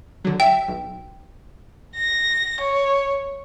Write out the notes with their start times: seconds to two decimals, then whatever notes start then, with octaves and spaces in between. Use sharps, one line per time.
0.24 D3 F#3
0.40 E5 G5
0.68 B1
1.96 A#6
2.61 C#5